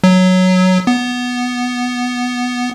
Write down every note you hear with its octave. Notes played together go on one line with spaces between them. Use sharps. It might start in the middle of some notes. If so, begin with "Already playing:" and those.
F#3
B3